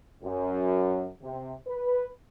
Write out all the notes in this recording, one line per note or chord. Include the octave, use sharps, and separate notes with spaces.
F#2
C3
B4